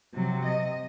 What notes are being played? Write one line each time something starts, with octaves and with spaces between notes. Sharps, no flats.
C3 F#3
D#5